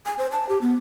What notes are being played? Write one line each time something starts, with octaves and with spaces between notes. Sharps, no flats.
G#5
C5
A5
G4
B3